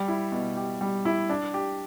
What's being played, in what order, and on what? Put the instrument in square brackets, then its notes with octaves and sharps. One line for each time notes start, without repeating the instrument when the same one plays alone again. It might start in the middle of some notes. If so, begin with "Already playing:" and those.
Already playing: [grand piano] G3
E4
B2
G4
G3
E4
D4
G4